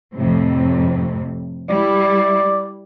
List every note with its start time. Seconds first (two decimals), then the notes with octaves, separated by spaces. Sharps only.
0.14 F2 A2 C3
1.70 G3 E4 D5